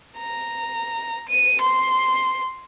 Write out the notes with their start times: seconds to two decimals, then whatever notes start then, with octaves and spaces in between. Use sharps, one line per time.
0.19 A#5
1.29 D#7
1.61 C6